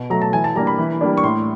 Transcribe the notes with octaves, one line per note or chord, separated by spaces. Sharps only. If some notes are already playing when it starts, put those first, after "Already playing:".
Already playing: B2
F#3 A3 A#5
A5
E3 G#5
A5
G3 A#3 D4 A#5
B5
E3
G3 A#3 D4
C#6
A2 C6